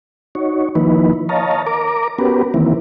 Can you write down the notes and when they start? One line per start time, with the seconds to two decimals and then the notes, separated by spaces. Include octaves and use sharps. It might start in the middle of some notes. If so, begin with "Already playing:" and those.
0.35 D#4 F#4 C#5
0.75 D#3 F3 A#3 D#4 E4 B4
1.29 C#5 D#5 F5 A5 A#5
1.67 A#4 A#5 D6
2.19 B3 C#4 F#4 G4 A#4 B4
2.54 D#3 E3 A#3 C4 E4